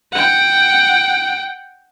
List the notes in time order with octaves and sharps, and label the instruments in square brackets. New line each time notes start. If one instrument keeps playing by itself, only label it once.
[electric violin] F#5 G5